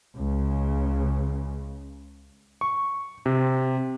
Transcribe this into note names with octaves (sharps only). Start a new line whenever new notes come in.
C#2 C#3
C#6
C3